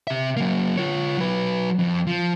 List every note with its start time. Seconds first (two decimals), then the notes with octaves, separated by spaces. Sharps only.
0.07 C3 E5
0.37 F#3 A#3
0.77 F4 C#5
1.18 F#3 B4
1.79 F2
2.07 F3